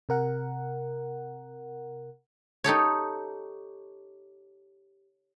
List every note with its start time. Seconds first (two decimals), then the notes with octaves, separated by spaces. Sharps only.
0.09 C3 A#4 F#5
2.64 D#4 G4 A4 C#5